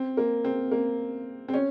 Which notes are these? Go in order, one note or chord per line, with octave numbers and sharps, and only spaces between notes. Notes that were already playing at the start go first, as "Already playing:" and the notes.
Already playing: C4
A#3
C4
A#3
C4
C#4